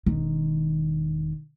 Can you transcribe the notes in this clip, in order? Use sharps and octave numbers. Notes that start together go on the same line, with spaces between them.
E1 D#3